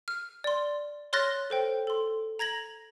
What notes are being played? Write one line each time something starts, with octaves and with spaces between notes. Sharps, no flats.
F6
D5 C6
C#5 C6 F6 F#6 A6 A#6
A4 C5 G5
A4 C6
A#5 G#6 A#6 F#7